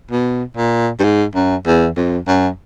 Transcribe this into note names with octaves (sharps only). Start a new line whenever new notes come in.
B2
A#2
G2
G#2
F#2
E2
F2
F#2